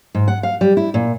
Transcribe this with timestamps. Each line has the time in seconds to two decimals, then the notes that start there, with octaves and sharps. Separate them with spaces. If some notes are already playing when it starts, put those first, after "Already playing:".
0.15 G#2
0.28 F#5
0.43 F5
0.61 G3
0.77 E4
0.94 A#2